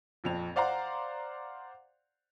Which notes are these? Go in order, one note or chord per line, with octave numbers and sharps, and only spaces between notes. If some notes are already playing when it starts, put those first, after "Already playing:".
A#1 F2 F7
C5 D5 F5 F#5 A#5 C6